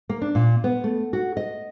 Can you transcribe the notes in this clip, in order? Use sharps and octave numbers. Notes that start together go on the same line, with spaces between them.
A#3
D4
A#2
B3
A3
F#4
D#5